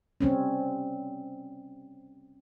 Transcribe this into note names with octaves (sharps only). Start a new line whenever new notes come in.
G3 C4 C#4